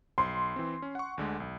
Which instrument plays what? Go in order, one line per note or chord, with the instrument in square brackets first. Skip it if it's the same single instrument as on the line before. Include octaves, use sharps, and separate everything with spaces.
[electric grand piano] B1 [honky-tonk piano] C6
[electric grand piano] E3 C4
C#4
F#5 C#6
D2 D3 G#3
B1